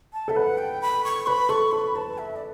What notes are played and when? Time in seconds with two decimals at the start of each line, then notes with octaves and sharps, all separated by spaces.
0.13 A5
0.28 A4 E5
0.36 B4 F#5
0.58 G5
0.82 B5
1.04 C#6
1.27 B4 B5
1.49 A4 C#6
1.71 A4 B5
1.95 B4 A5
2.18 E5
2.36 D5